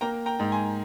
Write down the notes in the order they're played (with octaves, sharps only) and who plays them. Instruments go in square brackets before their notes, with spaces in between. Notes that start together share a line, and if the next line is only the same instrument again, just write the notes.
[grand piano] A#3 [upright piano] G5 A#5
[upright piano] G5 A#5
[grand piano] G#2
[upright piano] G#5 C6